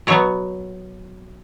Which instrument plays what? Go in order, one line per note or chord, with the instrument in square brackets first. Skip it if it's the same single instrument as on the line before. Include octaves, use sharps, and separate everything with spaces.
[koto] B2 F#3 B3 C#5